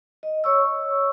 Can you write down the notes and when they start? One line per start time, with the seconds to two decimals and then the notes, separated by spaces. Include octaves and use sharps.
0.23 D#5
0.44 C#5 C#6 E6